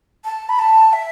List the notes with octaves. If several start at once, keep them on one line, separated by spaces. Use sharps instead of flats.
A5
B5
A5
E5